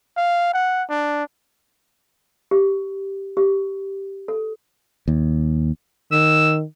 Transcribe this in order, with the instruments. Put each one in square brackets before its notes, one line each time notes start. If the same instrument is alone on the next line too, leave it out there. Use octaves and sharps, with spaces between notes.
[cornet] F5
F#5
D4
[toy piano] G4
G4
A4
[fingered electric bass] D#2
[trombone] D#3 [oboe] E6